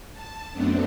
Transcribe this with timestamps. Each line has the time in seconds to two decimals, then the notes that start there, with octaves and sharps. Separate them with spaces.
0.13 A5
0.52 F#2 A3 B3 C4 D4